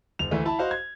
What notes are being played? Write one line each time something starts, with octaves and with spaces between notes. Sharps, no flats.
F#1 F7
D2 E3 A3
E4 A5 B5
F#4 C5 D#5 F5
G#6